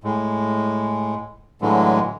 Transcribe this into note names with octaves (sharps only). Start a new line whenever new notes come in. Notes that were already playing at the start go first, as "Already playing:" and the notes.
A2 G#3
A2 D3 E3 F#3 G#3